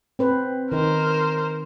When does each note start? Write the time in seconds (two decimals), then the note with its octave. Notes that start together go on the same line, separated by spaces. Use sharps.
0.19 C4 B4 C5
0.72 D#3 D#4 A#4 C5